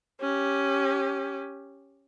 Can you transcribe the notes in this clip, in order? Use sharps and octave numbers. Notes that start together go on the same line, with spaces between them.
C#4 G4